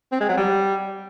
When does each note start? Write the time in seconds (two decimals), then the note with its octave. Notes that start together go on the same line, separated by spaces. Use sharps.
0.12 C4
0.21 G#3
0.29 F#3
0.37 G3